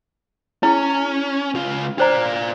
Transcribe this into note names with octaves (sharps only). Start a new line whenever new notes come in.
C#4 E4 G#4 A#5
C#2 F4
D4 F4 C5 D5 A#5